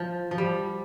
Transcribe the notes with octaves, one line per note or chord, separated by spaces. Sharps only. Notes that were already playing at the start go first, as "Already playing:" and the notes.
Already playing: F3
F3
G3